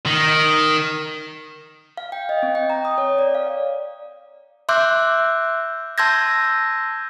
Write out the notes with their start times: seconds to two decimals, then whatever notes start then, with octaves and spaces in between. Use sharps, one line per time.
0.06 D#3
1.97 F5
2.12 G5
2.29 D#5
2.43 C4
2.55 G5
2.70 A#5
2.85 D#6
2.98 C#5
3.19 D5
3.35 F5
4.69 E5 C6 D6 E6 F#6 G6
5.98 A5 C6 E6 G6 G#6 A#6